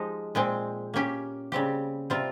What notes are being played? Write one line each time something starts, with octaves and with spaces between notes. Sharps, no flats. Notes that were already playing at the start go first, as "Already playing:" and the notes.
Already playing: F3 G#3 D#4 G4
A#2 G#3 C4
A#3 C#4 G4
C#3 G3 C4 G4
C3 G3 C4 F4